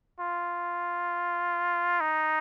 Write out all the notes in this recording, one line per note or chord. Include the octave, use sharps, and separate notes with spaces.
F4
D#4